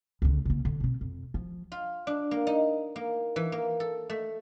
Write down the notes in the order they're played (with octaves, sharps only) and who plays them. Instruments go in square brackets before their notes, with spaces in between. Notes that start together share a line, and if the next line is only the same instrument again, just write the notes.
[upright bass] C#2 D3
C#3 A#3
D3
B2 C4
F2
F3
[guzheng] F4
D4
A#3
D#4
A#3
E3
A#3
A4
A3